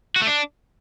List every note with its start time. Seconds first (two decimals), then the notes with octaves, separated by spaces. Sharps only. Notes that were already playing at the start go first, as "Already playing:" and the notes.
0.16 F#4
0.22 A3
0.27 D4